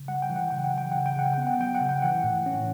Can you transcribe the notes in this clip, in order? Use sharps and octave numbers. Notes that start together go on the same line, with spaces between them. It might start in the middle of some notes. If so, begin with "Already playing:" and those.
Already playing: C#3
G3 F#5
G5
E3
F#5
C#3 G5
F#5
F#3 G5
C#3 F#5
G5
C#3 F#5
B3 G5
F#5
F#3 G5
F#5
C#3
G5
E3 F#5
A2
C#4